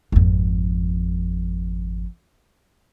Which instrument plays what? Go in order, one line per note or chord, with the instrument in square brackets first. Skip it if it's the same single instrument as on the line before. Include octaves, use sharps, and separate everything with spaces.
[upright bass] G#1 F2